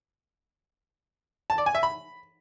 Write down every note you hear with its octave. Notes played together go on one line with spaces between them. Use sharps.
A5
D5
G#5
E5
B5